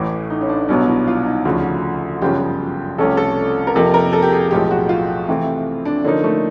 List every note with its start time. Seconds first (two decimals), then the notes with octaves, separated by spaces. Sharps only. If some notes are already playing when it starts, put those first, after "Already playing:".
Already playing: A1 A2 E3 A3
0.30 D#4
0.41 C#4
0.49 D4
0.68 C2 B2 F#3 B3 D4
0.88 E4
1.07 F4
1.26 D#4
1.45 D2 C#3 F3 F#4
2.22 G1 F#2 C#3 F3 G4
2.98 C2 C3 F3 A3 C#4 A4
3.17 A4
3.67 A#4
3.75 F2 C3 F3 A#3 A4
3.94 A#4
4.13 A4
4.22 G4
4.33 G#4
4.51 B1 A2 F3 G#3 G4
4.71 F#4
4.89 F4
5.28 C3 E3 A3 C4
5.85 D4
6.04 D3 F3 A#3 C#4 D#4
6.24 A3